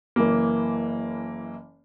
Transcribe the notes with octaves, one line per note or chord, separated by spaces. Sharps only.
F#1 E3 A#3